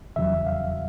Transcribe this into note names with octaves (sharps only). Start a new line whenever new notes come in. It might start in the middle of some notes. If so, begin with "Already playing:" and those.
E2 C#3 F#3 E5
F5